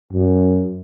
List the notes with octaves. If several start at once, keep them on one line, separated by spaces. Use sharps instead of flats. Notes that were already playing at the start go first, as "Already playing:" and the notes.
F#2